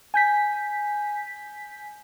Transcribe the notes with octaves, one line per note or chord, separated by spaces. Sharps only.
G#5 G6 B6